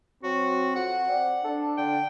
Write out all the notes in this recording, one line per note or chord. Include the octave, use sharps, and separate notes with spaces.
F#3 C4 F#4
F2 F#5
C4 D5
D4 A4
D3 G5